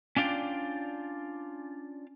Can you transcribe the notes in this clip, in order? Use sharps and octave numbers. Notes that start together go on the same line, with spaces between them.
C#4 D4 F4 D5 G5